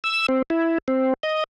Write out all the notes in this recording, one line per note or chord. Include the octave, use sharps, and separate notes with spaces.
E6
C4
E4
C4
D#5